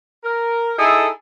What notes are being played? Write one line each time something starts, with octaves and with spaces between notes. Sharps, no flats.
A#4
D#4 E4 G#4 A4